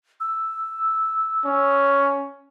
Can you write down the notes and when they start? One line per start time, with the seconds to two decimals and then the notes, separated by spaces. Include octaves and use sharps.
0.20 E6
1.45 C#4